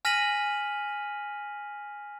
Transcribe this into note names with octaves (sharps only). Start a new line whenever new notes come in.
G#5 F6 A#6 B6 D#7 F#7